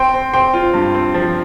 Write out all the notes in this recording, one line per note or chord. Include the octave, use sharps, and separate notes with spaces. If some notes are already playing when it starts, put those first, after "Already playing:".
Already playing: C4 G5 C6
C4
C4 G5 C6
F4
G2
C4
F3